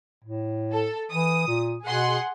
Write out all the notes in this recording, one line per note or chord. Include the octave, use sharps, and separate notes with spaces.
A2
A4
E3 D#6
A#2
B2 G#4 F#5 C6